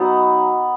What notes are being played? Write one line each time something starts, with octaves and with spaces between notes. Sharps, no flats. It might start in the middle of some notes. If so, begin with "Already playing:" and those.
Already playing: F#3 B3 D#4